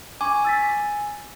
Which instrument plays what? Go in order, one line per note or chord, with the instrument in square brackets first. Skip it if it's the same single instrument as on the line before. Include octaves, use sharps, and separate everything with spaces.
[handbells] G#5 [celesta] C#6 D6
[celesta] E6 A6 B6